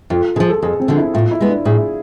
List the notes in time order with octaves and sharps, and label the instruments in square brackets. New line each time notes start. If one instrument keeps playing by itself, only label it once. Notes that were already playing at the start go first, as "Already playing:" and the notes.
[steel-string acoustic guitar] F2 [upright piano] F4
[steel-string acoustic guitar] D3 F3 [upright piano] G#4
[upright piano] A4
[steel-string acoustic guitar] F2 [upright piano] G#4
[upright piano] C4
[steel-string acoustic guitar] D3 F3
[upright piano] E4
[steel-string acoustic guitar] A2 [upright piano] F4
[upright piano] E4
[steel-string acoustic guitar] G#3 B3
[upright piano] D4
[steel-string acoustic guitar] A2 [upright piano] G#4